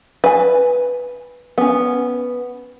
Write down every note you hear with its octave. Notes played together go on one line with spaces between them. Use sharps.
B4 G#5
B3 C#4